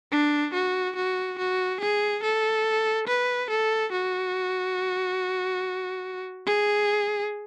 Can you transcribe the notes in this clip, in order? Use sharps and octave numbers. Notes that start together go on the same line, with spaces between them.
D4
F#4
F#4
F#4
G#4
A4
B4
A4
F#4
G#4